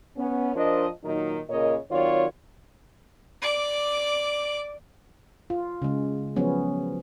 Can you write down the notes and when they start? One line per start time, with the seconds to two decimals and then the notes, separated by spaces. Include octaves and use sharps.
0.17 B3 C#4
0.55 F3 D4 A#4 C5 D#5
1.04 A#2 D#3 F#3 D#4
1.49 A#2 C#3 A#4 C#5 D#5
1.90 D#3 F#3 C4 F4 C#5 D5
3.42 D5 D6
5.50 F4
5.82 C#3 G#3
6.36 F3 F#3 B3 C#4